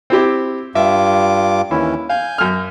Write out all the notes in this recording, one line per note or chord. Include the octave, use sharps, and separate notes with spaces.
C4 E4 G4
G2 F4 E5 D6
D#2 E3 C#4 E4
F5 G#5 G6
F#2 F6